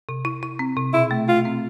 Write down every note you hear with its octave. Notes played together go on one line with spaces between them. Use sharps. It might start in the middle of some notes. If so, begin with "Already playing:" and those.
C3
E4
E4
C4
C3
B2 E4
A3
A3 F4
C4